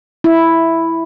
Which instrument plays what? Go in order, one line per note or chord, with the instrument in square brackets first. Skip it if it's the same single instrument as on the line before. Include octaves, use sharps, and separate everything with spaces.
[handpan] E4